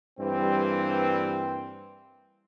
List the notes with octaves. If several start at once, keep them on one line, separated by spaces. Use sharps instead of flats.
G2 E3 G3 A#3 C4